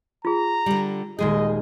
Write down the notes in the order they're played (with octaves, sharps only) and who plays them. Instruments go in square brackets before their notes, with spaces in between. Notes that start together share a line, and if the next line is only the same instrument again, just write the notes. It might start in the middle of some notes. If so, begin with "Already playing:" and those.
[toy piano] F4 G#4 [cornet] A#5
[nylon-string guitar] D3 G3
[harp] D#1 G#3 G6 [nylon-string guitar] G#4 [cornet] D#5